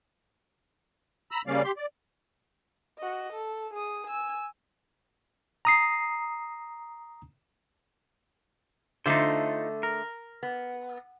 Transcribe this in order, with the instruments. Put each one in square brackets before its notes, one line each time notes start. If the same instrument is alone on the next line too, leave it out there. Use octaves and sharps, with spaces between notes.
[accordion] A#5 B5 E6
C#3 G3 A#3 C#4 D5 F5
G4 C6
D5
[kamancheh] F#4 D#5
A4
G#4 D#6
G#5 E6
[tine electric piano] A#5 D#6 C7
[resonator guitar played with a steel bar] D3 A3 [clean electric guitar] D#4 F4 C5
[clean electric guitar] A#4
[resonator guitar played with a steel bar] B3